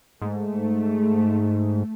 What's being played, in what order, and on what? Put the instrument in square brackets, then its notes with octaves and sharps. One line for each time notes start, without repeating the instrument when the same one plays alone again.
[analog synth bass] G#2 [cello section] A3